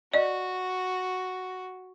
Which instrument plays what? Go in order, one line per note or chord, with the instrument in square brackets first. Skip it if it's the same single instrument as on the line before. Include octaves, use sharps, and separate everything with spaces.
[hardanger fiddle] F#4 [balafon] D5 D#5